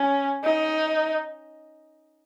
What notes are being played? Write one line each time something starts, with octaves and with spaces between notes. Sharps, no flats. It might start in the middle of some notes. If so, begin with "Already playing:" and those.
Already playing: C#4
D#4